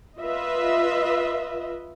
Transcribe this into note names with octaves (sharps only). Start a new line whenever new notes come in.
F4 B4 D#5 E5